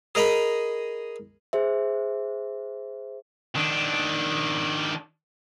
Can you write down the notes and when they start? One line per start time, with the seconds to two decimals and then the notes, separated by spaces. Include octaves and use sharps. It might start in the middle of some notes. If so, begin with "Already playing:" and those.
0.15 G#4 A#4 D#5 A#5 B5
1.53 G#4 C5 E5
3.56 D#3 D4